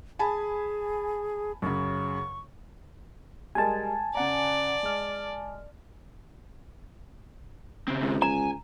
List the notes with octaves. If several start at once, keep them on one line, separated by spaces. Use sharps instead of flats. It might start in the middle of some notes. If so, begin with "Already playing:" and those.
G#4 G#5 A5 B5
F#2 C#3 C#6
G3 G#3 A#4 G#5 A5
C#3 D5 F#5 A#5
G#3 F6
C#3 C4
C#2
G#5 A#5